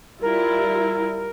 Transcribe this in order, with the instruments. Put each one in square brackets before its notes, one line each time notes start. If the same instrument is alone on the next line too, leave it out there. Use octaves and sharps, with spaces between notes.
[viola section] G3 E4 F4 [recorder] A#4